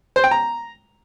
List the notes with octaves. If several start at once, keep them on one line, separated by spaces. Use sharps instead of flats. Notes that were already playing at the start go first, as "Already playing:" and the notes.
C5
G5
A#5